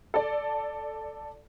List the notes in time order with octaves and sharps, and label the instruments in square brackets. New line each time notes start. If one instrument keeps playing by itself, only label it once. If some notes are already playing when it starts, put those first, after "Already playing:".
[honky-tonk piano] A4 D5